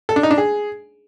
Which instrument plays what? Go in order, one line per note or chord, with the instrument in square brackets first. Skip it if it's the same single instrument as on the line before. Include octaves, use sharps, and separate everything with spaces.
[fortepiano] A4
D4
D#4
D4
G#4